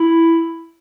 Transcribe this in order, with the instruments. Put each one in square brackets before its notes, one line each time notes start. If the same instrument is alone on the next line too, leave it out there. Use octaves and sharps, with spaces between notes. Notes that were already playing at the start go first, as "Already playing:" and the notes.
Already playing: [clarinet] E4